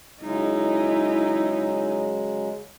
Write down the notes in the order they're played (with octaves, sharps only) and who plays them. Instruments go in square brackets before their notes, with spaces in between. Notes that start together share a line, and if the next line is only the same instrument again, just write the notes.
[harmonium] C#3 F#3 G#3 [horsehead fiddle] D#4 E4